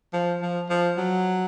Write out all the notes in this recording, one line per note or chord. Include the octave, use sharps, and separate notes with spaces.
F3
F3
F3
F#3